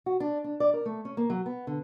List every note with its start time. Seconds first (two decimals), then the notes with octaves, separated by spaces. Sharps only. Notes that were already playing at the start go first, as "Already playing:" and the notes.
0.06 F#4
0.20 D4
0.44 D4
0.60 D5
0.74 A#4
0.86 A3
1.05 C#4
1.17 A#3
1.30 F#3
1.46 B3
1.67 D3